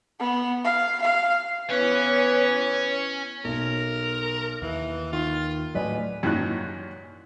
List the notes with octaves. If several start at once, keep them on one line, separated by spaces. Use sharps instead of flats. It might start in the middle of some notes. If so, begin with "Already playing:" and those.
B3
F5
F5
E3 B3 C#4 B4 C#5
B1 A#4
D#2 E3
D#3 F4
A2 F#3 B4 D5 D#5 G#5
F#2 A#2 D#3 E3 F#6